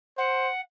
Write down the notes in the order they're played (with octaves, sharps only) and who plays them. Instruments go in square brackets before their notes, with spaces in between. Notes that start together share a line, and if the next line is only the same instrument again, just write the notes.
[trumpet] C5 [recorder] F#5